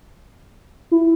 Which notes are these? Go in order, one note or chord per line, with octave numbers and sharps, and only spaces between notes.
E4